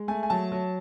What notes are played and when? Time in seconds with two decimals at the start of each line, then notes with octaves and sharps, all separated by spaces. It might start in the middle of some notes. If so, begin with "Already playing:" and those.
Already playing: G#3
0.08 A3 G#5
0.23 G#5
0.30 F#3 A5
0.52 F#3